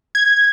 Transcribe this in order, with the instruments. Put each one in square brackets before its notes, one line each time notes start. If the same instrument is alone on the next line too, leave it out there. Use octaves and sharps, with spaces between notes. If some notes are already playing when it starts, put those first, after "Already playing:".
[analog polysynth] G#6